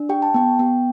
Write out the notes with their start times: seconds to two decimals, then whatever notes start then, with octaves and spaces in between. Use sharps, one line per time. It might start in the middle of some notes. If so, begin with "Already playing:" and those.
Already playing: D4
0.09 G4 G5
0.22 A5
0.34 B3 G5
0.59 B3